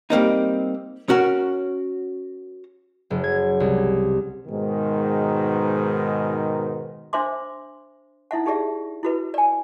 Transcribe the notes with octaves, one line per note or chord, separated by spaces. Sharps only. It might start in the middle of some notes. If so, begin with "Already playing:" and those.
G3 A#3 C4 D#4
C#4 F#4 A#4
F#1
G#6
C2
G#2 B2 D#3
D4 C5 E5 C6 D6
D#4 E4 E5 F#5
D#4 G4 G#4 D5 E5
E4 F#4 B4
D5 G#5